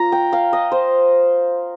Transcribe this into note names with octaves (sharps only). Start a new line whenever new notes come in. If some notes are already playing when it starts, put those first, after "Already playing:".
Already playing: A#3 F4 A#5
G5
F5
D#5
C5